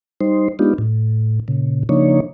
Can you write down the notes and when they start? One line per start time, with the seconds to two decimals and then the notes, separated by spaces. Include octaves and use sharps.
0.21 G3 D#4 C5
0.59 G#3 B3 D4 D#4 F4 G4
0.78 A2
1.48 A#2 C#3
1.89 C#3 F3 A#3 D4 D#4 C#5